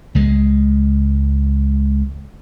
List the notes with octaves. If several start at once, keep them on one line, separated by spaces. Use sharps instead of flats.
C#2 G#3